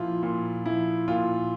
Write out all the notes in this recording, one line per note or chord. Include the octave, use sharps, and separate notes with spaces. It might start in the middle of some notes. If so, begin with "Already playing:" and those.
Already playing: A#2 F3 E4 F4
A#2
F3 E4
A#2 F4